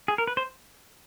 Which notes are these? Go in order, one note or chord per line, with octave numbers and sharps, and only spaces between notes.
G#4
A#4
B4
C5